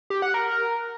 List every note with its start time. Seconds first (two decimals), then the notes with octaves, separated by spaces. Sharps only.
0.10 G4
0.22 F#5
0.34 A#4